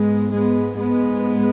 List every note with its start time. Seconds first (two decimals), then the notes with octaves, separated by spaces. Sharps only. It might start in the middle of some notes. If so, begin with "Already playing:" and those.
Already playing: G#2 G#3 B3
0.31 G#3 B3
0.76 G#3 B3